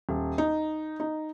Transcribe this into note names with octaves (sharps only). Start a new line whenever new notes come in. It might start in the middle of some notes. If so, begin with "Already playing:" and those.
D#1
D#4
D#4